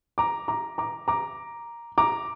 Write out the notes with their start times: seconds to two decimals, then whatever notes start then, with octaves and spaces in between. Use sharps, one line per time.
0.18 A#5 D6
0.48 A#5 D6
0.78 A#5 D6
1.08 A#5 D6
1.98 A#5 D6